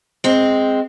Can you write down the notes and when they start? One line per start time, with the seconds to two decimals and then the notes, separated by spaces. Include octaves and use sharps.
0.24 G#3 C4